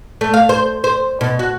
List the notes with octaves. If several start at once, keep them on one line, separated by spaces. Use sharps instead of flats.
A3
F5
C5
C5
B2
F#4